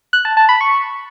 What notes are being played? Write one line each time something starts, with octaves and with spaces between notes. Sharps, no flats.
F#6
A5
A5
B5
C#6